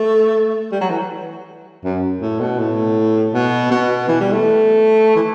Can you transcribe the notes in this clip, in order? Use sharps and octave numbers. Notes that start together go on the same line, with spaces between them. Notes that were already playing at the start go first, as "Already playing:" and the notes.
Already playing: A3
G3
F#3
E3
F#2
A2
B2
A2
B2
B2
E3
G3
A3
E3